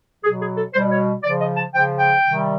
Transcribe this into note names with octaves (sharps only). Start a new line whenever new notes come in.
B2 F#3 G#4
G#4
A4
B2 G3 C5
C#5
C#3 F3 D5
D#5
A5
C#3 F3 G5
G5
C3 D#3 G3